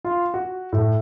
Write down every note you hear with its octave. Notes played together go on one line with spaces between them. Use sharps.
F4
F#4
A2